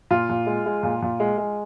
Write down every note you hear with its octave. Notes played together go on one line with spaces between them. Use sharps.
A#2 F4
A#2
G#3
G#3
A#2
A#2
G#3
G#3